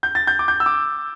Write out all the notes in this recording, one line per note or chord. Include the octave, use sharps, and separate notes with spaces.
G6
A6
G6
D6
G6
E6
D6